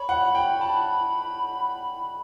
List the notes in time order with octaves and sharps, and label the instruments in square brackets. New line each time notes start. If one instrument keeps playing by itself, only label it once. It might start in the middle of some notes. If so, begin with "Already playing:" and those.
Already playing: [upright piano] C#5 [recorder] B5
[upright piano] F#5
G5
A5